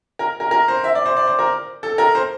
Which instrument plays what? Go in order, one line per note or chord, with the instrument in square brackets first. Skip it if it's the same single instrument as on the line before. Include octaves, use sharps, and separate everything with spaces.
[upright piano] A#4
A#4
A#4
C5
E5
D5
C5
D5
C5
A#4
A4
A#4
C5